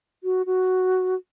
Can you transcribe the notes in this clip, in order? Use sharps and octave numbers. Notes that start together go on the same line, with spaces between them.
F#4
F#4